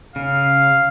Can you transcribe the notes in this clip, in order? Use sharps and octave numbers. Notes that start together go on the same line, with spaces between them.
C#3 F5